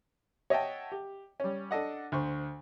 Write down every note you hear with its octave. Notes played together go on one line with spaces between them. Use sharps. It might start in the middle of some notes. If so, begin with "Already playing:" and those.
C#5 D#5 E5 F#5 G5 A5
G4
G3 C#4
D4 A4 D#5 F#5
D2 C5 C#6